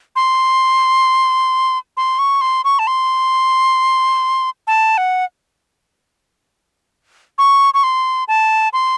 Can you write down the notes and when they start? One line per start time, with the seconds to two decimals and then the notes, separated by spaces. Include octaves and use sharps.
0.16 C6
1.97 C6
2.19 C#6
2.41 C6
2.64 C#6
2.79 A5
2.87 C6
4.67 A5
4.98 F#5
7.38 C#6
7.74 C#6
7.83 C6
8.28 A5
8.73 C6